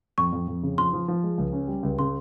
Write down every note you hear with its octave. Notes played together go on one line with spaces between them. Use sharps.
F2 C#6
F2
F2
C#3
F3 C6
F3
F3
G#3
C#2
C#4
G3
C#2
C#3 C6